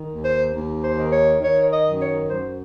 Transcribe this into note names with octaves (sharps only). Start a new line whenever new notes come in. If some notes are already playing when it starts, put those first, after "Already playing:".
Already playing: D#3
D#2
C5
D#2
C5
D#3
C#5
D#3 C#5
D#5
F#2
C#5
F#2 C5